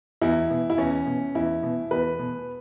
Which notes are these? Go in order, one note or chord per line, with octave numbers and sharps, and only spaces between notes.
E2 E4
B2
E4
E2 C#4
B2
E2 E4
B2
E2 B4
B2